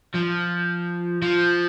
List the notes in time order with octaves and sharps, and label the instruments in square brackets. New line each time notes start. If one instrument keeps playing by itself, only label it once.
[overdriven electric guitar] F3
F3